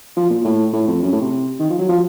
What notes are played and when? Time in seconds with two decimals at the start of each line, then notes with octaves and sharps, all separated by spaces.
0.16 F3
0.30 A#2
0.44 A2
0.73 A2
0.88 F2
1.03 F#2
1.12 A2
1.21 C3
1.59 D#3
1.70 F3
1.78 F#3
1.89 F3